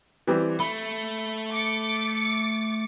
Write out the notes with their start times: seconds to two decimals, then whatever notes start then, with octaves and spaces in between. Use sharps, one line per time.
0.27 E3 G3 C4
0.60 A3 B5
1.51 D6 A6 C#7